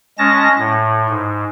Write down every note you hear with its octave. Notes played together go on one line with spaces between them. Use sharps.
G#3 C#4 A5 A#6
A2
G#2